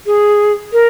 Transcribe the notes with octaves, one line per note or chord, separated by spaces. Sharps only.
G#4
A#4